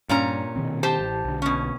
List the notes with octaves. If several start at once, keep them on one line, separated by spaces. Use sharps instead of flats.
G2 A#2 C#4 A#5
B2 D#3 C4
G4 C5 A5
A1
B1 D3
B2 C#4